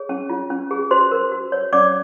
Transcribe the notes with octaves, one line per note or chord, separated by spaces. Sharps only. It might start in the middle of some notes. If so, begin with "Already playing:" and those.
Already playing: G#4 C#5
C#4
F4
C#4
G#4
F#4 C5 C6
A#4
F#4
C#5
C#4 D5 D6